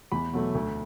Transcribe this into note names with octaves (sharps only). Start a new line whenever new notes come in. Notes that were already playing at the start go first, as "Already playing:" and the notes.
E2 B5
B2 F#3 A3
D2